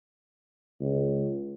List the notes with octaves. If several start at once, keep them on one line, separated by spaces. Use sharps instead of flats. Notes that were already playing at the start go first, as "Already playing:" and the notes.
C#2